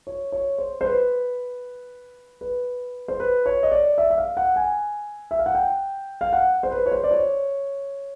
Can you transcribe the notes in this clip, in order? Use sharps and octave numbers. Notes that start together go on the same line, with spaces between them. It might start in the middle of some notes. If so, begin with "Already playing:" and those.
C#5
C#5
C5
C5
B4
B4
C5
B4
C#5
D#5
D5
E5
E5
F5
F#5
G#5
E5
F5
F#5
G5
F5
F#5
C5
B4
C#5
C5
D5
C#5